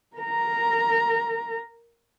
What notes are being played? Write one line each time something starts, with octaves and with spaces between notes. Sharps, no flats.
A#4 A#5